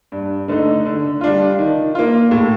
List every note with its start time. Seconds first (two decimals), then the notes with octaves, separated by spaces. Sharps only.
0.12 G2
0.48 D3 A3 D#4
0.85 D3
1.21 G3 D4 F4
1.59 D#3
1.95 A#3 F4
2.31 A2